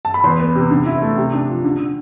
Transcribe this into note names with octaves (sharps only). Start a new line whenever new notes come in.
A5
B5
E2 C6
B3
C3
D3
E4
A3
C3
D4
F3
D3
D3